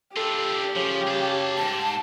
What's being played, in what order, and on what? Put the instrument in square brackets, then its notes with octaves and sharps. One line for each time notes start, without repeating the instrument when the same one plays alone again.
[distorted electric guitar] D4 F4 [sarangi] G4 [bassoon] A4
[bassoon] C#3 [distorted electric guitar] F3
[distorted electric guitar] G#4 A5
[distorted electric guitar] E2 G#2 [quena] A5